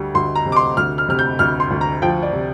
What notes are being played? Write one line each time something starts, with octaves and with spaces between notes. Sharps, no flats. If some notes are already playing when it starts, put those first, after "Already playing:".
Already playing: D2 G3
D2 C6
A#5
C3
D6
C6
D2 F6
F6
C3 F6
G6
D2 F6
C6
D2
A#5
F3 G5
D5
C3